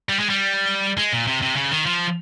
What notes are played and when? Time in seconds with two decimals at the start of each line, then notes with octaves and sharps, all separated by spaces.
0.09 G3
0.20 G#3
0.30 G3
0.98 G#3
1.13 A#2
1.27 C3
1.42 C3
1.56 C#3
1.71 D#3
1.86 F3